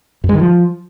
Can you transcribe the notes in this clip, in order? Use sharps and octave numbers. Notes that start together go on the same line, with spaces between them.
F#2
G#3
D#3
F3